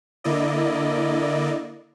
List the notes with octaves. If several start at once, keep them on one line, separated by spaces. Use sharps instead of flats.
D3 A#3 E4 D5 D#5